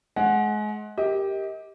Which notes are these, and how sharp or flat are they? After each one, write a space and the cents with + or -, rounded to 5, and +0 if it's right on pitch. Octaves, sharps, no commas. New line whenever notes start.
G#3 +30 F#5 +0
G4 +0 A#4 +0 D#5 +35